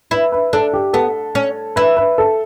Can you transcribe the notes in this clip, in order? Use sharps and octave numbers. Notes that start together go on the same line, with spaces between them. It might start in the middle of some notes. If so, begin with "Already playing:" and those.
E4 B4
B4
D4 A4
G4
B3 A4
C#4
E4 B4
B4
A4